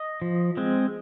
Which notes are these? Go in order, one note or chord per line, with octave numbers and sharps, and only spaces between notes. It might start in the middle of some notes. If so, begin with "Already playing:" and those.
Already playing: D#5
F3
G#3 C4